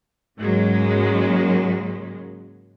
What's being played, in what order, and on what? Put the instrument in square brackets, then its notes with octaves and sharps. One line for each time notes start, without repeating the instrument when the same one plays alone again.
[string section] G#2 C#3 F#3 G#3 A#3